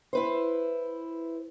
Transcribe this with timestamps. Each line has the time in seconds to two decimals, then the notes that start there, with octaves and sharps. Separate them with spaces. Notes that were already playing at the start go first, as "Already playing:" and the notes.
0.13 E4 B4 C5